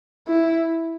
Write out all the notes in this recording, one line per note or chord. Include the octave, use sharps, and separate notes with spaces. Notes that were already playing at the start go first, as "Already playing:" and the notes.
E4